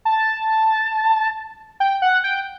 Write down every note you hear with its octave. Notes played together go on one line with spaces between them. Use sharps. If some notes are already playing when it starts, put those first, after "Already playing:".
A5
G5
F#5
G5